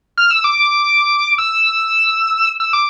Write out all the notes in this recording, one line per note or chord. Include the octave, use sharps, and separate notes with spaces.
F6
E6
D6
D6
E6
E6
D6